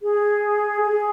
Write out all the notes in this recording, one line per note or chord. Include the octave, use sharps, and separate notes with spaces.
G#4
G#4